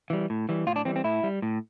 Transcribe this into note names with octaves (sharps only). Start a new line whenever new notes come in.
E3 G3
A2
E3 G3
A2 F4
D4
E3 G3 C4
C4
A2 E4
G3
A2